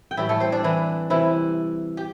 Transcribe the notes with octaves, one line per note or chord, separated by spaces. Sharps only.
G5
A2 E3 G3 E4 E5
A3 A4
C4 C5
D4 D5
E3 E4
C3 E3 G3 E4
G4